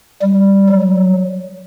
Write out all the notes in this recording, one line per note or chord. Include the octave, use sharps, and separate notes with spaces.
G3
F#3